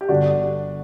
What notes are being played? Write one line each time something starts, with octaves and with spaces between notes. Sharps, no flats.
G4
G1 G2 D3 D4 F#4